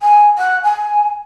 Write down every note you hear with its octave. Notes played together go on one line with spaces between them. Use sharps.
G#5
F#5
G#5